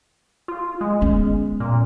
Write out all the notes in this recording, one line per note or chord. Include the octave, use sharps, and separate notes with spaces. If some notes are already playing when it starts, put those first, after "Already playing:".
F4
G#3
B3 C#4
A#2